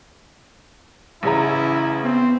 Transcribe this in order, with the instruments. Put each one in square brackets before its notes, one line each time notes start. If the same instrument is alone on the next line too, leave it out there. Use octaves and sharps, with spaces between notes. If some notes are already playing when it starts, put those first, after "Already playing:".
[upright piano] A1 C#3 A#5 [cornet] E4
[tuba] B3 [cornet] C4